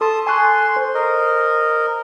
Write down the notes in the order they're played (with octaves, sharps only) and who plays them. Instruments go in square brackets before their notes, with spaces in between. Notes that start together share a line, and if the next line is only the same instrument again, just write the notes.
[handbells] A4 C6 [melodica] A5 D#6
[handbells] G#5 C#6 F#6 [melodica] C6
[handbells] C5
[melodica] A#4 D#5